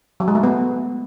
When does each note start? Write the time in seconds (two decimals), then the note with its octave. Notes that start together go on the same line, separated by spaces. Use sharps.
0.20 F#3
0.28 G#3
0.35 A3
0.43 B3